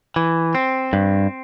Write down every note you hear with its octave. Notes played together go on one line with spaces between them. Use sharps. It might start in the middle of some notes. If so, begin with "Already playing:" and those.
E3
C4
G2